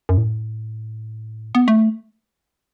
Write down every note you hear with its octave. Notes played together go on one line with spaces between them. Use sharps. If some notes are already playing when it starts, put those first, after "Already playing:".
F#2
A2
B3
A3